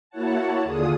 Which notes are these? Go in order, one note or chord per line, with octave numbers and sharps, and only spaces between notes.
A#3 E4 F#4 C#5 F#5 A5
D#2 D3 D4 F4 G#4 D#6